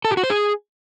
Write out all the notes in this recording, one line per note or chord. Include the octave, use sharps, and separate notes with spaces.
A4
G4
F#4
C5
G#4